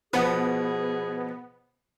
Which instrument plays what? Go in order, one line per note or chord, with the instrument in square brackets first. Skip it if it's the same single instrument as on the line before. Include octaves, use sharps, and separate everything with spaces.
[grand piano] B2 [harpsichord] F3 [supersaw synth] B3 [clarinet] G#4